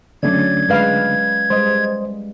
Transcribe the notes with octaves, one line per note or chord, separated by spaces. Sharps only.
D3 F#3 A3 C#4 D4 D5 G#6
G#3 B4 F5
G3 G#3 C5 D#5